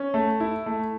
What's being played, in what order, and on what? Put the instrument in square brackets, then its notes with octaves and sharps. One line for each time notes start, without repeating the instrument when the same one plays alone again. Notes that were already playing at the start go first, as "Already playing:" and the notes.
Already playing: [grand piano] C#4
A3
E4
A3